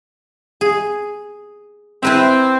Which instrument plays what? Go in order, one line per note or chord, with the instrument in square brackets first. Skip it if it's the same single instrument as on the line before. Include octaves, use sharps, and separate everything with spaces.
[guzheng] G#4
[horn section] C4 [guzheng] E4 B4 E5